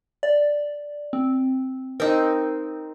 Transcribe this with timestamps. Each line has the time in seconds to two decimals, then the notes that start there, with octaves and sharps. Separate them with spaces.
0.23 D5
1.13 C4
2.00 C4 D#4 A#4